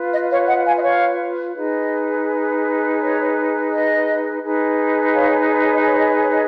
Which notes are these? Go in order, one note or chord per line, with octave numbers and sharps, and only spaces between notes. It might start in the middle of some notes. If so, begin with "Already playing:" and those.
Already playing: F4 B4
D#5
C#5 F5
D#5 F#5
F5 G#5
D#5
C#5 F5
D#4 G#4 B4 D#5
C#5
D#5
D#4 G#4 B4
C#5 F5
D#5
C#5
D#5
C#5
D#5
C#5
C#5
D#5